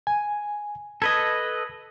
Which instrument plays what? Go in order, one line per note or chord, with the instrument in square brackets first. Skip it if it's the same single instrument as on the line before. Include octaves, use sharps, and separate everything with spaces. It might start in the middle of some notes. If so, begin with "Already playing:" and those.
[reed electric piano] G#5
[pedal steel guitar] A4 B4 D#5 [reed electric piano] G#6